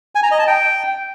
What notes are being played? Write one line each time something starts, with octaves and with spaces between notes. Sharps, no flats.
G#5
A#5
D#5
A5
G5